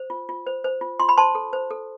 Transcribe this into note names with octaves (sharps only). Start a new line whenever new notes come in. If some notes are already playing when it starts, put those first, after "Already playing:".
Already playing: C5
F4
F4
C5
C5
F4
F4 C6
B5
C5 A5 C6
A4
C5
A4